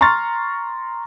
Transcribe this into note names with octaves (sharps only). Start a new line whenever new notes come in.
A#5 C6 C#6 F6 A6